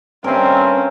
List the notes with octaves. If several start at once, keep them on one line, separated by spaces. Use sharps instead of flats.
G2 C4 C#4 A#4 E5